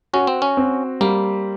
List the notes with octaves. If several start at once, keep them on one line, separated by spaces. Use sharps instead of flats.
C#4 F#4
C4
C#4
C4
G3 A#3